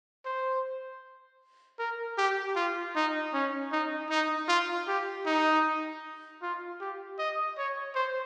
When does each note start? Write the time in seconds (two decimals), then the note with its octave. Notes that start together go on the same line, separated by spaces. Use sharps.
0.25 C5
1.79 A#4
2.18 G4
2.56 F4
2.95 D#4
3.33 C#4
3.72 D#4
4.10 D#4
4.48 F4
4.87 G4
5.26 D#4
6.42 F4
6.80 G4
7.19 D#5
7.57 C#5
7.95 C5